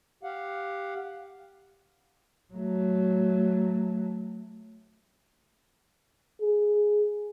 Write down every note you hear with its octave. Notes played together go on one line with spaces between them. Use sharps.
G4 F5 F#5
F#3 A3
G#4